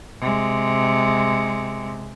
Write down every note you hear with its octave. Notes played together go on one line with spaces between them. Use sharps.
C3 G#3